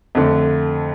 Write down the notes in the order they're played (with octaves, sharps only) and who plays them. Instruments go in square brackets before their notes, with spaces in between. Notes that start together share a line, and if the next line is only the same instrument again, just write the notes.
[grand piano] F2 D3 A3